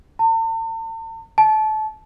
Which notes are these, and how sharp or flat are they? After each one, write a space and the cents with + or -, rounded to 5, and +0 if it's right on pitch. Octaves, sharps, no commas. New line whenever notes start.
A5 +45
A5 -25